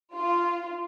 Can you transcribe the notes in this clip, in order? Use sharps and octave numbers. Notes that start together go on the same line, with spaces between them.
F4